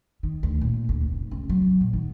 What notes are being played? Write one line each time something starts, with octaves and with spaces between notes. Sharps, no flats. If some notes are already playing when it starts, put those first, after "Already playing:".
D#3
D2
A#2
D2
F1
C#2
F#3
A#2
D#3